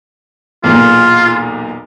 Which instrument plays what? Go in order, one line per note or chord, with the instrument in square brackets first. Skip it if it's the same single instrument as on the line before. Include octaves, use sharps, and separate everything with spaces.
[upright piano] B1 E2 A#2 [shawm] F4